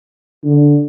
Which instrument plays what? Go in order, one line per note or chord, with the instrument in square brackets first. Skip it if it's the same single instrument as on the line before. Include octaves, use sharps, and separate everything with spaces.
[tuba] D3